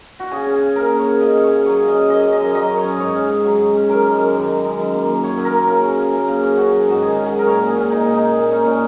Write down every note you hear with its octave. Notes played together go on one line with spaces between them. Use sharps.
F#4
C#3 G#4
C#4
G#4
C#3
A#3 A#4
C#3
C#5
C#4
C#3 D#5
C#4
C#5
C#3
F#3 C#5
C#3
D#5
C#4
F#2 D#5
C#4
D#5
F#2
F#3 D#5
F#2
C#5
C#4
G#2 C#5
C#4
G#2
F#3
G#2
C#4
F#2 A#4
G#3
F#2
D#3
F#2
G#3
F#2
A#3
F#2
F#3 C#5
F#2
A#4
A#3
C#3 A#4
C#4
C#3
A#3
C#3
C#4
C#4 F#4
F#3
G#2 F#4
D#3 G#4
C#4
G#4
F#3
A#4
A#2 C#5
C#4
G#4
A#2
A#3 D#4
A#2
D#4
C#4
A#2
C#4 D#4
A#2 C#4